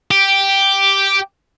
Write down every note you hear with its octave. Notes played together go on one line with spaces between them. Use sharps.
G4